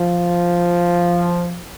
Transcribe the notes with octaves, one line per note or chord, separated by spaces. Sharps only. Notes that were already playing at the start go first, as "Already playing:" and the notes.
Already playing: F3